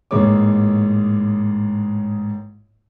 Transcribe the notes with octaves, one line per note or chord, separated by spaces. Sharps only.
A1 G#2 G#3 A#3 C#5 D6